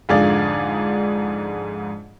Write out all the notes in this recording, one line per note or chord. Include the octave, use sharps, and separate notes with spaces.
F2 G#2 D3 G#4 D5 F5